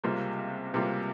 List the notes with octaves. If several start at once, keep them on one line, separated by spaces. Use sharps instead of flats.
C#2 C3 G3 A#3 F4
C#2 C3 G3 A#3 F4